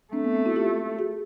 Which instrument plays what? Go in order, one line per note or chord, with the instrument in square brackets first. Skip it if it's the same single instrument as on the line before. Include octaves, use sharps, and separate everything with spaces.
[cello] A3 [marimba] C4 D4
[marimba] B3
C4
E4 F#4
F4 G4
F#4 G#4